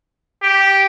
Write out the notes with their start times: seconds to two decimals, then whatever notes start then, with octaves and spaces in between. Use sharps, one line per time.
0.43 G4